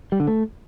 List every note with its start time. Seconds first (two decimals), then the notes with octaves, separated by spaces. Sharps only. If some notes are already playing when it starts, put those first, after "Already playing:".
0.12 G3
0.20 D3
0.27 A3